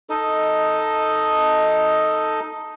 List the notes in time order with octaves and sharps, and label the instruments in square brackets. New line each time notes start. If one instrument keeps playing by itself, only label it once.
[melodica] D#4 A4 D#5